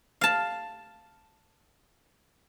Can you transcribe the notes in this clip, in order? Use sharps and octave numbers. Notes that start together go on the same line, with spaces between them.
F5 A5